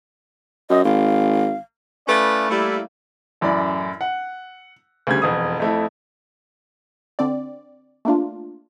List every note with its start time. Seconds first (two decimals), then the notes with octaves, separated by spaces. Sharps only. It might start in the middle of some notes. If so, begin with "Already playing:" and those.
0.70 F#2 D#5
0.85 G#1 F5
2.07 A3 C#4 E4 B4 D5 F5
2.49 G3 A3 A#3 E4
3.41 A1 F#2 E4 D5 B5
4.01 F#5
5.07 D2 C#3 G3 G#6
5.22 E1 F2 D#6
5.60 F2 A3 E4
7.19 D3 C4 D5
8.05 A3 A#3 D4 F4